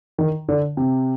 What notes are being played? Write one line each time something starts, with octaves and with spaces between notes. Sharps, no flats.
D#3
D3
C3